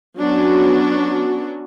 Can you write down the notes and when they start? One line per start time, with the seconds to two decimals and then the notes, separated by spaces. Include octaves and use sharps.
0.18 F#3 B3 C#4 D4 F#4